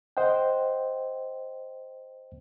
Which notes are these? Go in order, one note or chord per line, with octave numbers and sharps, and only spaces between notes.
C5 D#5 F#5 G5